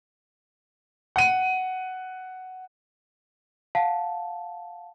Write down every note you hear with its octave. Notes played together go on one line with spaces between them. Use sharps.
F#5 D#7
F5 F#5 A5